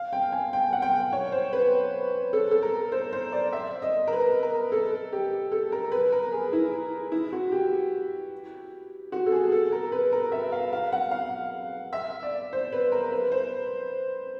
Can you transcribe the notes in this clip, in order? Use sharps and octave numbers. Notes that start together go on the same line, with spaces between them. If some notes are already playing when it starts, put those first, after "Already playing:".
Already playing: F5
G5
G#5
G5
F#5
G5
C#5
C5
B4
A4
A4
A#4
C5
C5
D5
E5
D#5
A#4
B4
A#4
A4
G4
A4
A#4
B4
A#4
G#4
E4
E4
F#4
G4
F#4
A4
G#4
A4
A#4
B4
A#4
E5
F5
F5
F#5
F5
E5
D5
C5
B4
A#4
B4
C5